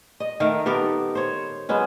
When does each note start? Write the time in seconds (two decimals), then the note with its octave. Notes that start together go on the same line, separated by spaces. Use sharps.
0.20 D#5
0.40 D#3 A3 A#4 F5
0.66 B3 G4 A4 A#4
1.15 C5 C#5
1.69 F#3 G#3 B3 C#4